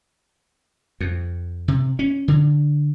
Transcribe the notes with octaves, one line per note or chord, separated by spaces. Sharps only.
F2
C3
C#4
D3